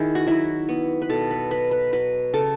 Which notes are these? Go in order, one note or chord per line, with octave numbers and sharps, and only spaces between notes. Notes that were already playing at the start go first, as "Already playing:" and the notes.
Already playing: D#3 E4 G#4
F#4
F#3 E4
B3
B4
B2 A4
B4
F#3 B4
B4
F#3 B4
C#3 A4